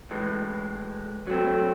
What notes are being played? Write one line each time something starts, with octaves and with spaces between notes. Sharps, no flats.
A2 E3 G#3
F#3 A3 C4